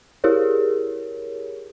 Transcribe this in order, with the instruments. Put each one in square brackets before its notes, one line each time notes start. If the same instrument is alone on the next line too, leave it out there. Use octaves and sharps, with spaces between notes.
[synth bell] E4 G4 G#4 A#4 C#5